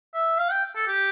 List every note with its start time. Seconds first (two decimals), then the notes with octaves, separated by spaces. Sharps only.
0.14 E5
0.39 F5
0.51 G5
0.76 A4
0.87 G4